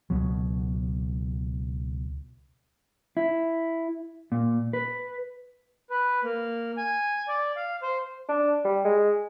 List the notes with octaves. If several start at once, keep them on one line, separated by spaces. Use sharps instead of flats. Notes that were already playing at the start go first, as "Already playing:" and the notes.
C#2 B2 F#3
E4
A#2
B4
B4
A#3
G#5
D5
F5
C5
D4
G3
G#3